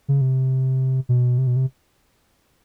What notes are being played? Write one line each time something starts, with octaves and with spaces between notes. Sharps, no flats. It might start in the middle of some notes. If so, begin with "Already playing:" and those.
C#3
C3
B2
C3
B2
C3